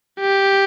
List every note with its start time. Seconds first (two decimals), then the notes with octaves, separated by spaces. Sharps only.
0.20 G4